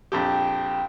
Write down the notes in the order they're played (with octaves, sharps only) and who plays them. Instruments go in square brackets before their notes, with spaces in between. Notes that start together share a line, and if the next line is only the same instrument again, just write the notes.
[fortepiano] A#1 F2 G4 [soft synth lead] G5